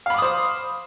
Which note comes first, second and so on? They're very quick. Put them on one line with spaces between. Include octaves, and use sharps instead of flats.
F5 B5 D6 D#6 C5